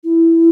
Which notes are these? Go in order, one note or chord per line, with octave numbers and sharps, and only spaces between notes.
E4